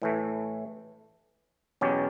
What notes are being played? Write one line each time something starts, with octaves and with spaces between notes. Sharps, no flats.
A2 E3 A3
E2 B2 F#3 C#4 G4